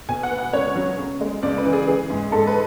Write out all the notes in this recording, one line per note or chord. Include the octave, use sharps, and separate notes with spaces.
B2 G#5
F#5
B3
F#5
C#2 C#5
F#3
C#3
G#3
C#2 D5
B4
E3
G#4
E3 G#4
G#2
G#2 A4
B4